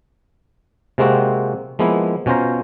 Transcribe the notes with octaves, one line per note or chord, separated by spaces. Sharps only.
C3 G#3 A#3 C4 F#4
F3 G#3 A#3 B3 E4
B2 C#4 F4 C5 A#5